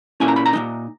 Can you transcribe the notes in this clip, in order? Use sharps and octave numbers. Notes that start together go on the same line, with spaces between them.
A#2 A#3 C#4 E4 G#5
A#5
B5
A#5
A#2 G#3 D#4